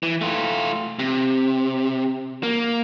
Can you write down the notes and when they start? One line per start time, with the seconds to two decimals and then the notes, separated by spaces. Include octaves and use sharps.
0.03 E3
0.21 A3 F4
0.99 C3
2.43 A#3